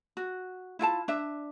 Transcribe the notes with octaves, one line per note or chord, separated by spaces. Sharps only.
F#4
E4 F4 G5 A5
D4 E5